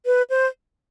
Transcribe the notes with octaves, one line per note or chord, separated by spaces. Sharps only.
B4
C5